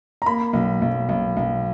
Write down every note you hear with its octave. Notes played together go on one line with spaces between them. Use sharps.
A#5
A#3 B5
B1
B1
B1
B1